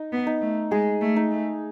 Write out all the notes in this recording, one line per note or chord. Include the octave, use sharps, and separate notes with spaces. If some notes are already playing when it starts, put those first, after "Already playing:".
Already playing: D#4
B3
D#4
A3
G#3 G#4
A3
D#4
A3